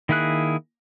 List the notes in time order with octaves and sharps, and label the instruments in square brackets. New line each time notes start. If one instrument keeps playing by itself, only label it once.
[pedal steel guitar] D#3 A#3 E4 G#4 F#6